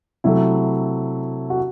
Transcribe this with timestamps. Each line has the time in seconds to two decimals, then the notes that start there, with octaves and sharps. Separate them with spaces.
0.24 C3 F#3 A3 E4
1.50 F#4